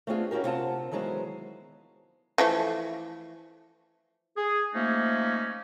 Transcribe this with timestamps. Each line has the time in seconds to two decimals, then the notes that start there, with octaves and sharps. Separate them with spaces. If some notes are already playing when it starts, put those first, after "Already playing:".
0.07 A3 B3 C4 D4 F4 G#4
0.31 C#4 E4 F#4 G4 A#4
0.44 C3 B3 C4 F4 F#5 A5
0.91 D#3 E3 F#3 G#3 B3 C5
2.38 E3 F3 A3
4.36 G#4
4.74 F3 A3 A#3 C#4 D#4